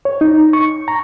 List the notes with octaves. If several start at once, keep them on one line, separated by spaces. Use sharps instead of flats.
C#5
D#4
C#6
A#5